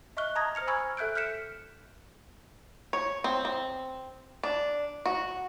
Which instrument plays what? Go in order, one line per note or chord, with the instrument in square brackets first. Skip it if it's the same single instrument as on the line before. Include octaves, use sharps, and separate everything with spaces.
[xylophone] D#5 E5 C#6 F6 F#6 G7
A5 A#5 D#6 G#6 A#6
C5 F6 C#7 F7
G#5 B5 C#6 E6 F6 G#6
A4 E5 F#6 G6 D7
F6 G6 B6 C#7 E7
[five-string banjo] C#5
C4
C4
D4
F#4